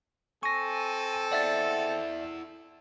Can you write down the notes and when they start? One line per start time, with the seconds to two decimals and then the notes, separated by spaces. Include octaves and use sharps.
0.43 C4 A4 G#5 C#6 A#6
1.32 E4 D5 E5 F#5 A6